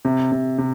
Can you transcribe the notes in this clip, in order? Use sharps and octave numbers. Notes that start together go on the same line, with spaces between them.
C3
C3
C3